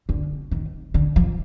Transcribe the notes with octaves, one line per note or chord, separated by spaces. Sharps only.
D3
D#3
D3
F3